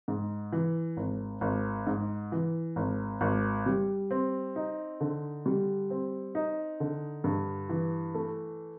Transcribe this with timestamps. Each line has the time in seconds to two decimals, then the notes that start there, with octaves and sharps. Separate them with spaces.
0.08 G#2
0.52 E3
0.97 G#1
1.41 G#1
1.87 G#2
2.32 E3
2.76 G#1
3.21 G#1
3.66 G3
4.11 C4
4.56 D#4
5.01 D3
5.46 G3
5.90 C4
6.35 D#4
6.80 D3
7.24 G2
7.69 E3
8.14 A3